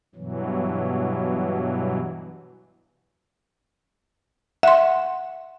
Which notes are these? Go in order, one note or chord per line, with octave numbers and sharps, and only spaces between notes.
G2 B2 E3 F#3
E5 F#5 C6